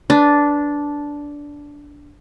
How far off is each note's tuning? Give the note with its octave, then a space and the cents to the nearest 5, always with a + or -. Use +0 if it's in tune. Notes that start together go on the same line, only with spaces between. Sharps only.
D4 -10 B4 +0